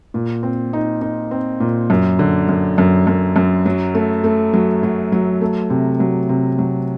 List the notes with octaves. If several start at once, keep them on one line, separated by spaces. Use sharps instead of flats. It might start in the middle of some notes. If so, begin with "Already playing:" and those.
A#2
C4
D#4
D#4
C4
A#2
F#2
D3
F#2
F#2
F#2
F#2
F#3
A3
A3
F#3
F#3
F#3
A3
C3
F#3
C3
F#3